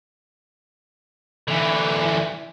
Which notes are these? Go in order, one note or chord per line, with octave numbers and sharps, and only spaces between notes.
D3 E3